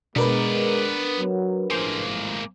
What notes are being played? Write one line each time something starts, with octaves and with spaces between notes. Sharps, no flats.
B2 G#3 B3 D4 A#4 B4 D5
F#3
A1 A2 F3 G#3 A#3 C5